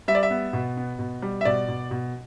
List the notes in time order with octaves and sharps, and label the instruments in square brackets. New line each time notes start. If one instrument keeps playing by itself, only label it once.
[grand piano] G3 E5
D5
E5
B3
B2
B3
B2
G3
E5
B2 D5
B2
B2